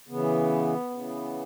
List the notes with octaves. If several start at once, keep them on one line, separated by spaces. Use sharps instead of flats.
C#3 E3 B3
C#3 E3